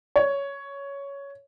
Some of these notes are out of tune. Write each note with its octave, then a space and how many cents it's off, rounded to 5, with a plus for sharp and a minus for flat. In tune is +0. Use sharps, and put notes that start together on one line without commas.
C#5 +10